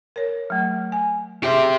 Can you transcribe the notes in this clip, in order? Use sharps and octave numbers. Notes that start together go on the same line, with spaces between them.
A#4 C#5
F#3 A3
G#5
G4 G#4 C5 E5